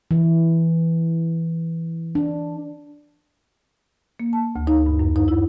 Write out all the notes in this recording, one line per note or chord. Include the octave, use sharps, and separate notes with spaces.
E3
D4
A#3
A5
D2
D#4
G2
F#2
D#4
E4